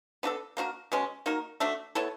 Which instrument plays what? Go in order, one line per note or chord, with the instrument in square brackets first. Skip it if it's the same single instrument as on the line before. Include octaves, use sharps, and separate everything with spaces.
[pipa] B3 D4 F#4 A4
A#3 D4 F#4 A#4
B2 G#3 C#4
A#3 D#4 F#4 A#4
A3 D4 F#4
B3 E4 A4 C#5